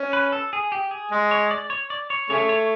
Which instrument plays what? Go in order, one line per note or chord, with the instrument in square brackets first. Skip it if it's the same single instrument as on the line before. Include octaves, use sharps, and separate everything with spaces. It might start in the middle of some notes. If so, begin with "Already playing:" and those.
Already playing: [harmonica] C#4
[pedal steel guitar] B4
A4
G#4
G4
G#4
[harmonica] G#3
[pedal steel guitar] C#5
D5
C#5
D5
C#5
[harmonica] C#3 A3 [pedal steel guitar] C#5
[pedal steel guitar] C#5